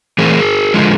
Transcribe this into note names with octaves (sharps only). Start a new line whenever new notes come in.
E3 A3 C4 G#4 A#4
D3 F3 G#3